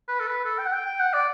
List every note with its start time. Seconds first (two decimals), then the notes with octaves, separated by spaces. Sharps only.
0.08 B4
0.20 A4
0.27 B4
0.45 A4
0.58 G5
0.66 F#5
0.72 G5
0.86 G5
1.00 F#5
1.13 D5